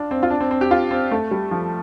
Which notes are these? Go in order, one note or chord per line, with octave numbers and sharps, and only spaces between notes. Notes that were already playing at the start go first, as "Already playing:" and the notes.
Already playing: D4 F4
C4
F4
D4
C4
C4
G4
F4
C4
A3
G3
F3